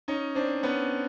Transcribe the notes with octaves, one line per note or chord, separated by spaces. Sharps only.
C#4 D#4
C4 D4
B3 C#4